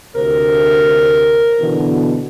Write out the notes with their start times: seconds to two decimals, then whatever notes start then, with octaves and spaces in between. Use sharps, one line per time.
0.15 D2 C3 A#4 C5
1.60 B2 D3 E3